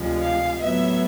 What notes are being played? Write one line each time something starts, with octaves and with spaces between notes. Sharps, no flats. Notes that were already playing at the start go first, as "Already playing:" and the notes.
Already playing: D2 C3 F3 G#3
F5
A2 F#3 B3 E5